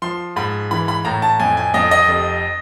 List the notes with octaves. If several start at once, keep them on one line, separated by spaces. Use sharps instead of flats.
F3 C6
G#2 B5
E3 B5
B5
A2 A#5
A5
F2 G#5
G#5
F2 D#5
D#5
F1